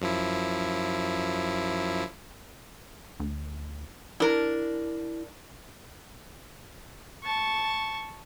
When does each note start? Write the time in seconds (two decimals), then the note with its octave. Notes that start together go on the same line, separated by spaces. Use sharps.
0.01 F#2 F3 E4
3.20 D2
4.20 D4 E4 A#4
7.24 A5 C#6